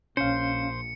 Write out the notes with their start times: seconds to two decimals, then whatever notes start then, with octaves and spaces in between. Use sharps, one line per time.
0.17 A#1 C#4 C5 F5 C#7